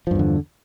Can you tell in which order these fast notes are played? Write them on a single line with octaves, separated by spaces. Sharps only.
F3 G2 E2 D3